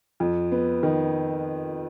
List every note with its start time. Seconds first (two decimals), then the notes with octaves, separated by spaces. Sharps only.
0.20 F2
0.52 B3
0.83 D#3